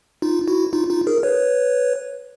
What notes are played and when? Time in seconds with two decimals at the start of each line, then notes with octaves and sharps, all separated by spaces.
0.22 D#4 F4
0.48 E4 F#4
0.73 D#4 F4
0.89 D#4 F4
1.07 G#4 A#4
1.23 B4 C#5